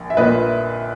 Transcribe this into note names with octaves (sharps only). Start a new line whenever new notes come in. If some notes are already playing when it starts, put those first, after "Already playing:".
Already playing: A#1 A#2
E5
A#1 A#2 B4 D#5